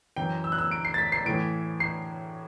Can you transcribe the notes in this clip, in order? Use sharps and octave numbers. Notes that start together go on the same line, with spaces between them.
F#2 E3 G5
E6
F#6
E6
D7
C7
A6
B6
C7
A2 E3 D7
C7